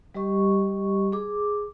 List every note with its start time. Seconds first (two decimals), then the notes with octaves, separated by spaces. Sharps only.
0.15 G3 G4 D#5 C#6
1.12 G#4 D6